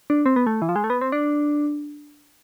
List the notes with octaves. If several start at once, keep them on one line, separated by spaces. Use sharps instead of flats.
D4
C4
B3
A3
E3
F3
G#3
A3
B3
C4
D4